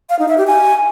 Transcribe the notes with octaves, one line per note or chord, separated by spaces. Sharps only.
F5
D#4
E5
G4
G#5